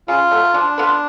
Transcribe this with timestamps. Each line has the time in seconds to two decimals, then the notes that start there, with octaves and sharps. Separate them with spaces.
0.08 C#3 F4
0.31 F#3 A3
0.54 F3 D4
0.78 B3 F4 B4